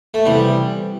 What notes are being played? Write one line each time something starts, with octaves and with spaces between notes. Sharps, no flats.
A3
C3 E3 G3 B3